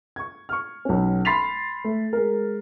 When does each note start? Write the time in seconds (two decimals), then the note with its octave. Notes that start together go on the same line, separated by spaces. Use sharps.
0.16 C#6 G#6
0.49 C#6 F6
0.85 B1 C#4
1.25 B5 C6 A6 B6 C7 F7
1.84 A3
2.13 G#3 A#4